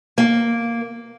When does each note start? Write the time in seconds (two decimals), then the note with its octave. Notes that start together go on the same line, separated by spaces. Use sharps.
0.18 A#3